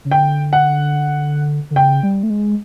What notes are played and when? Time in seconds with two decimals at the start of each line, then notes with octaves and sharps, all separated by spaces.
0.05 C#3
0.11 D3 G5
0.53 F#5
1.71 D3
1.75 C#3 G5
2.03 G3
2.23 A3
2.30 G#3